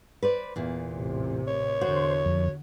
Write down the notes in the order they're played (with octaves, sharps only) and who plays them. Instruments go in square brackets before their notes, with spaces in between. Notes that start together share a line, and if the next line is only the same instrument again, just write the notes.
[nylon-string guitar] B4 C5 D5
E2 A#2
[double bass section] A1 A2 C3
[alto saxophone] C#5
[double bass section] E2 D3 [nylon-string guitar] F#4 [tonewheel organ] C5
[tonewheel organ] F2